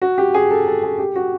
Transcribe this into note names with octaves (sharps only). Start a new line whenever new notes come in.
F#4
G4
G#4
A4
A4
G#4
G4
F#4